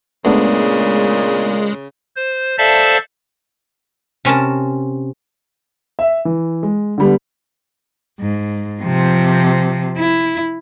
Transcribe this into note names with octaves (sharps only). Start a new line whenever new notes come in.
A#2 C#3 G#3 A3 B3 D4
C5
A4 C5 D5 E5 F5 A5
C3 C#4 A#4 A5
E5
E3
G#3
D3 G3 B3
G#2
C3 F3
E4